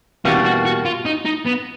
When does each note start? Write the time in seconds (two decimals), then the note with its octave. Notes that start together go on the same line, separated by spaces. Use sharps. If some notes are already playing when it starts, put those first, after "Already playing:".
0.25 E2 B2 G3 A#3 C#4
0.45 F#4
0.65 F#4
0.85 F4
1.06 D#4
1.26 D#4
1.46 B3